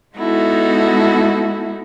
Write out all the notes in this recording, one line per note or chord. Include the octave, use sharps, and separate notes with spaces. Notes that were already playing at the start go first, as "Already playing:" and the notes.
G#3 B3 D#4 E4 F#4 A4